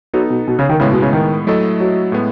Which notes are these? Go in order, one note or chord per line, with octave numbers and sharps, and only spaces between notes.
F#3 B3 D#4 A4
B2
B2
C#3
D#3
A2 C#3 G#3 B3 E4
B2
C#3
D#3
F#3 A3 E4 A4 D#5
F#3
A2 G#3 B3